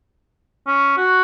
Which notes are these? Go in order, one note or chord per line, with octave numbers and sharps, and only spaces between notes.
C#4
F#4